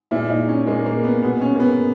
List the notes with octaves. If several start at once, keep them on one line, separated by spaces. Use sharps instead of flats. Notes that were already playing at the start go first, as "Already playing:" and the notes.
A#2 G#3 E4
D#4
C#4
A#2 G#3 A#3
A#3
B3
B2 G#3 B3
C#4
A#3
B3